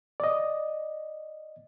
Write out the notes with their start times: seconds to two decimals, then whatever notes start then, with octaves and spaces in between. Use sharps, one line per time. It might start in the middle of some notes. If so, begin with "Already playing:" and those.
0.20 D5 D#5